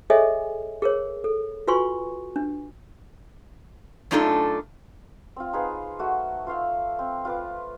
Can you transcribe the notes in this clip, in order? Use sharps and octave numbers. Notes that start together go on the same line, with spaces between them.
G#4 A4 C#5 D#5 E5 G#5
G#4 A#4 C#5
A4
F4 F#4 B4 G#5 C6 C#6
D4
F#2 A3 D4 D#4 F4 A4
C4 F4
D#4 F4 G#4 B4
A3 F#4
F4 C5 F5 E6
C4
F4 B4 D6